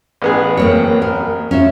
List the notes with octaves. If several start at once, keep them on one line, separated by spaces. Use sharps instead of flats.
A1 B3 G#4
A#3 C4 C#5
A#4
C#4 F4 E5